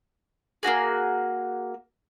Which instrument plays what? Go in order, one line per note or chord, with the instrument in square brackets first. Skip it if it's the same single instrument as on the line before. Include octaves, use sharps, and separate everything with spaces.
[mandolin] A#3 D4 F#4 G#4